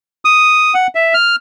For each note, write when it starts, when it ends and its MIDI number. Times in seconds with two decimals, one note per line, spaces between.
0.25 0.74 87
0.74 0.87 78
0.95 1.14 76
1.14 1.36 89